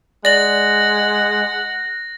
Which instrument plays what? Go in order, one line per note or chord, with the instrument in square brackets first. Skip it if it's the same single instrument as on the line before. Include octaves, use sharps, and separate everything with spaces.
[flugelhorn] G#3 [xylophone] D5 F#7 [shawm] F#5 [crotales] A#6